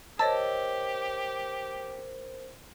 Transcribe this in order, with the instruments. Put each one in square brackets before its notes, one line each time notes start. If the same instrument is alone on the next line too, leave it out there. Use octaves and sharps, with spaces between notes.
[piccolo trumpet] G4 [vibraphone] A#4 C5 [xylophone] C#5 D#5 E6 [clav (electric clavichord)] A5